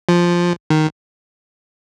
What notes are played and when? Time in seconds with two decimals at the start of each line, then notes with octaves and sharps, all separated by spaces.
0.09 F3
0.70 D#3